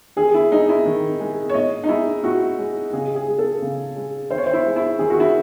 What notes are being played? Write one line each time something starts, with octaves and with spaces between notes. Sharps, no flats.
D#3 G#4
E4
G#3 D#4
E4
D#3
G#3
C#5
A2 D#5
D#4
G#3 E4
A2 F#4
G#3
C#3 G#4
G#4
G#3
A4
C#3
G#3
D#3 C5
C#5
C5
E4
G#3
E4
D#3 G#4
F#4
E4